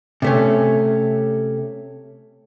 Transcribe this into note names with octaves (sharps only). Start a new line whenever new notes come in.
C3 A3 C#4